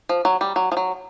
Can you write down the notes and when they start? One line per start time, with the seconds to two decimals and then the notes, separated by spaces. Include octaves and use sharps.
0.09 F3
0.25 F#3
0.41 G3
0.56 F#3
0.72 F3
0.77 F#3